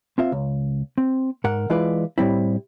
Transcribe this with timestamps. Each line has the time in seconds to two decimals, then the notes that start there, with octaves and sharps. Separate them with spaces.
0.18 C4 F4 E5
0.32 C#2
0.98 C4
1.44 G#2 A#4 F#5
1.70 E3 G#3 E4 F4 B4 D5
2.18 A2 G3 C4 E4